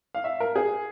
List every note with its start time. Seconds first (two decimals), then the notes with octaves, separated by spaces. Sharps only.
0.15 F5
0.24 E5
0.40 A#4
0.56 G#4